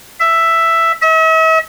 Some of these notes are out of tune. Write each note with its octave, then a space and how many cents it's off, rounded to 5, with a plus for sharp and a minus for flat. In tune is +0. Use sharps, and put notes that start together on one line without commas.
E5 +5
E5 -45